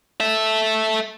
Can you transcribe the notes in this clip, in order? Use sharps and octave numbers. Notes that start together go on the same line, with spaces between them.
A4 E5